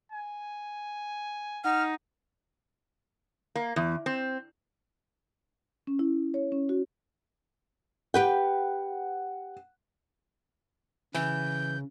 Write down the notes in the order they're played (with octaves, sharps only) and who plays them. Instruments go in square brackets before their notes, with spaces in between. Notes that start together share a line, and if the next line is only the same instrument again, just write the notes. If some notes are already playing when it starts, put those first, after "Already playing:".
[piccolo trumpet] G#5
[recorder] D#4 [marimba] F#5 [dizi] F6
[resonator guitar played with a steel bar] A#3
E2
C4
[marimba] C#4
E4
C#5
C#4
F#4
[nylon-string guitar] G4 B4 G5 [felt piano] F#5
[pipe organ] C#3 [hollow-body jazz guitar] E3 [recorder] G6